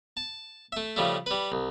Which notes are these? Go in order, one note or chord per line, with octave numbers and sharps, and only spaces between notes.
A5
A3 E5
C#3 F3 G3 A3
G3 B4
C2